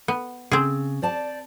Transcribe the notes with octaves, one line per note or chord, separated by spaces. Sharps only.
B3
C#3 C4 G#4
C5 D5 A5